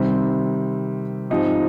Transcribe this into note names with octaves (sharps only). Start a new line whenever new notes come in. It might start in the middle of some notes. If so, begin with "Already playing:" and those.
Already playing: C3 D#3 G3 C4
G#2 F3 C4 D#4 G4